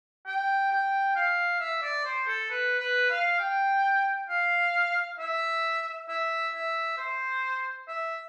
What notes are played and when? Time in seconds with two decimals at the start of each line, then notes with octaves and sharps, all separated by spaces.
0.26 G5
0.70 G5
1.16 F5
1.60 E5
1.82 D5
2.05 C5
2.27 A4
2.50 B4
2.80 B4
3.10 F5
3.40 G5
4.29 F5
5.19 E5
6.08 E5
6.54 E5
6.98 C5
7.88 E5